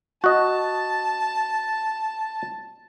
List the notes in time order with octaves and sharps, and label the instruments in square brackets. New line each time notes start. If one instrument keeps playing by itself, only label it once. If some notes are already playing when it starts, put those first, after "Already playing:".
[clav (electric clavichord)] F#4 D#5 [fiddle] A5